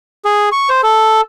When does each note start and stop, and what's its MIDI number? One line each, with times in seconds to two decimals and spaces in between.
0.25 0.49 68
0.52 0.69 85
0.69 0.81 72
0.83 1.21 69